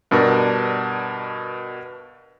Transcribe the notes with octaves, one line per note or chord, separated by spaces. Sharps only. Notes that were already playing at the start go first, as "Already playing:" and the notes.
G2 B2 D4 A#4